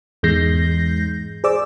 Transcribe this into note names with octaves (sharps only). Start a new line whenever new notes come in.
E2 G#2 G#3 G6 A#6 C7
G#4 C5 D5 D6 E6